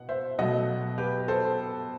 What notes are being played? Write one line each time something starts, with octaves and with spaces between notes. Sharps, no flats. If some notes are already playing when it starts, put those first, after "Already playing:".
Already playing: B2 F#5
C5 E5
B2 F#3 A3 D#5 F#5
G4 B4
A4 C5